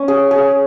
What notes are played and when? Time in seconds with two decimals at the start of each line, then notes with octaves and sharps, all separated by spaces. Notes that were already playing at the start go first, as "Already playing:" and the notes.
Already playing: C#4
0.08 G#4
0.31 G#4